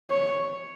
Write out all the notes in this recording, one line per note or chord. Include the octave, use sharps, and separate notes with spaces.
C#5